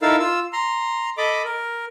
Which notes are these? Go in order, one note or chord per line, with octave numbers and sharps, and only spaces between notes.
D#4 E4 A4 A#4 F5 E6
F4 E6
A#5 C6
A4 D#5 B5 D6
A#4